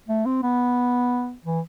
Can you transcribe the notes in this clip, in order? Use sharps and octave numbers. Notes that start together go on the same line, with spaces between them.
A3
C4
B3
E3